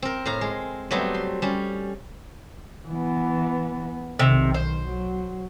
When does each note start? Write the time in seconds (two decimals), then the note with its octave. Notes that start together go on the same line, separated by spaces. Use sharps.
0.02 C4 A#4
0.25 A2 F5 A#5
0.41 G#3
0.91 F#3 G3 A3 B3 C4
1.14 C6
1.42 G3 C#4
2.88 E3 B3
4.19 B1 C3 D#3
4.54 C5
4.89 F#3